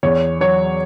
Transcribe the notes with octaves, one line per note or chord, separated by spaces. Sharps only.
E2 C#5
F#3 C#5